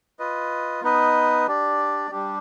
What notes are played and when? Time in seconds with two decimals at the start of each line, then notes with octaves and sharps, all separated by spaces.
0.19 F4 B4 D#5
0.83 B3 D#4 B4 D#5
1.47 D4 G4 D5
2.11 G3 D4 G4